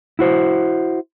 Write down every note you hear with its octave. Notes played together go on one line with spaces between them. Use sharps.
E4 F#4 C5